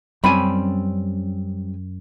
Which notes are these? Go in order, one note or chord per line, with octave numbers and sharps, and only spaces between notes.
F#2 G3 C4 C#4 G#5 B5